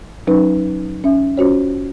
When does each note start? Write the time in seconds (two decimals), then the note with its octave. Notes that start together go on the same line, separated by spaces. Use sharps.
0.27 F#3 C#4 D#4 B4
1.04 C#4 E5
1.37 C#4 F4 F#4 C5 C#5